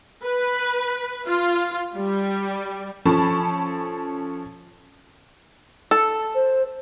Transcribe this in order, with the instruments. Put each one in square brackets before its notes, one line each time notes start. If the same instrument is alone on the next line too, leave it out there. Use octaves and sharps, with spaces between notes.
[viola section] B4
F4
G3
[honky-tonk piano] F3 C#4 A4 A5 B5 C#6
[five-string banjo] A4
[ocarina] C5